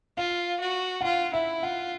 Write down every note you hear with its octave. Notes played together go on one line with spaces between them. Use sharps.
F4 F5
F#4
F#5
F4 F5
E4 E5
F4 F#5